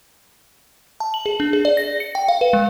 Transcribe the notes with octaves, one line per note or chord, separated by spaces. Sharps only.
A5
F#7
G#4
D4
G#4
D5
A#6
C#7
G5
F5
B4
G#3